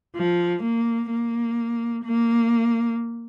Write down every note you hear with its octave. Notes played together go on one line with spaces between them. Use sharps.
F3
A#3
A#3
A#3